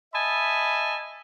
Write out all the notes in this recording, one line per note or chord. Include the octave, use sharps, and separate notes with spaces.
D#5 E5 G#5 A5 B5